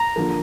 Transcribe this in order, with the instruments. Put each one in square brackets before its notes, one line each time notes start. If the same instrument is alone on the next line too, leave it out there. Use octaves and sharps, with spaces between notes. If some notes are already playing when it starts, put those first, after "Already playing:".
Already playing: [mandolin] A#5
[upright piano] D3 F3 A#3